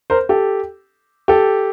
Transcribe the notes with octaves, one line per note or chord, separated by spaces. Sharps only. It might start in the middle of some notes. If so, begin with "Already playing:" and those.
A#4 C5
G4 A4
G4 A4